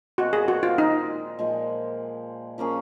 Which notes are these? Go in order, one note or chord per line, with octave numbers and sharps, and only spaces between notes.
A#2 F3 G#3 C4 F#4
G#4
F#4
F4
D#4
A#2 F3 G#3
F3 A#3 C#4 G#4